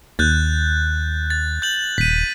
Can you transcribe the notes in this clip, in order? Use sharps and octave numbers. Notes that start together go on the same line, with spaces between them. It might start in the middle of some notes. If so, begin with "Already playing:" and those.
D#2 F#6 G6 A6
A6
G6 F#7
D#1 B6 D#7